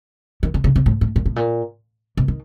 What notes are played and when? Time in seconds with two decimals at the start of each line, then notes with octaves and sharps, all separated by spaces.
0.43 D#3
0.54 D3
0.64 C#3
0.76 C3
0.86 A2
1.01 A2
1.16 A#2
1.26 A2
1.36 A#2
2.17 B2
2.28 D#3